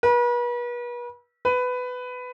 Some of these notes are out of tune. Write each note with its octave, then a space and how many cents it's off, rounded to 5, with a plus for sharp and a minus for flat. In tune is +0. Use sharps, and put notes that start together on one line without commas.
B4 -40
B4 +15